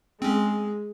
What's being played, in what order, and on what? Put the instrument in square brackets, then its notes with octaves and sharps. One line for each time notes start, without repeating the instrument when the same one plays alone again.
[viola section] G#3 [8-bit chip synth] C4 C#4